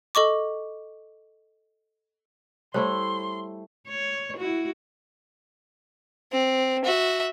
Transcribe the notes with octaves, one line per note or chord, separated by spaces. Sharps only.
A4 D#5 C#6 D6
G3 A3 E4 C5 C#5 C6
C#5
E4 F#4
C4
F#4 E5